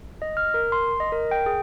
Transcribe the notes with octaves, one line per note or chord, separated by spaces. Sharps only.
D#5
F6
A#4
C6
D#5
A#4
G5
G#4